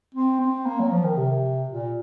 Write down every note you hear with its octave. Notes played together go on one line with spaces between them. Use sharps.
C4
C4
A#3
F#3
F3
D#3
C3
A#2